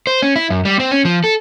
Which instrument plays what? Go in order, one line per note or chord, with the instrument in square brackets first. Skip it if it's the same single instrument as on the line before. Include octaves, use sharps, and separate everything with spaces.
[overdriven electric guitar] C5
C#4
E4
F#2
G3
C4
C#4
F3
A4